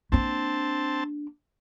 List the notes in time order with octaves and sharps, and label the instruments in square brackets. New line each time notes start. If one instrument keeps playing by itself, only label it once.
[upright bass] A#3 D4 [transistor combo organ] C4 A5